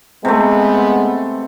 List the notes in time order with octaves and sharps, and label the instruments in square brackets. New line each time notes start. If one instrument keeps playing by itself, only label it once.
[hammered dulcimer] C3 A3 [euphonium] G#3 [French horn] B3